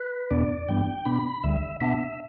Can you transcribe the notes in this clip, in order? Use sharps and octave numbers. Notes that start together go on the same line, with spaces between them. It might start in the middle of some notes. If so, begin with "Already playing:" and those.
Already playing: B4
E2 B2 B3 D4 D5
G2 E3 G3 B3 D4 G5
B2 B3 D4 B5
D2 D3 G3 E5
B2 B3 D4 E5